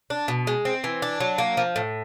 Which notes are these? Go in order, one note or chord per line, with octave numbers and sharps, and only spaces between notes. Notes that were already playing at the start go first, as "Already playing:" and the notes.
D4
B2
G#3
C4
E3
D4
F#3
A#3
F3
A2